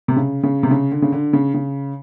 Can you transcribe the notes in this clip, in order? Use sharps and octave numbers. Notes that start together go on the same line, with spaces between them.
C3
C#3
C#3
C3
C#3
D3
C#3
D3
C#3
C#3